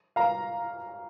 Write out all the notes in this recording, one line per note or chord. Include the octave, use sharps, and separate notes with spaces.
F5 A#5